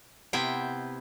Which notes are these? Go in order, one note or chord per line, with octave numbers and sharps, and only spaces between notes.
C3 B3 E4 C5 G5